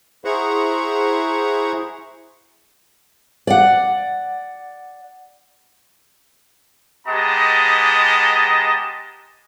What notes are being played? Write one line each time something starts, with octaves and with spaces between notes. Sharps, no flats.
E4 G#4 C5 F#5 A#5 C#6
D5 F#5
G#3 B3 G4 D#5 A5 A#5